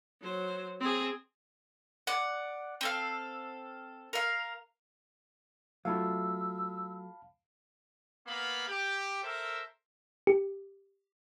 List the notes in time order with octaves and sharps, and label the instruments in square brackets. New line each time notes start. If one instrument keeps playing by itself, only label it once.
[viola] F#3 C5
C4 G#4
[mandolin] D5 F#5
C4 A4 F5
A#4 F5
[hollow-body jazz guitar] F#3 A3 F4 [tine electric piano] F5 A5 B5 [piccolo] E6
[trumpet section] A#3 B3 F5 B5
G4
A4 A#4 C5 E5
[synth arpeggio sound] G4